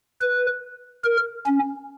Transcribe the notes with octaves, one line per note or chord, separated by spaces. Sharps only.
B4
A#4
C#4